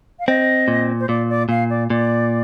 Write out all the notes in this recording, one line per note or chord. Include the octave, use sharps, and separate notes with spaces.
F5
C4 D#5
A#2
C5
A#2 D5
D5
A#2 F5
D5
A#2 D5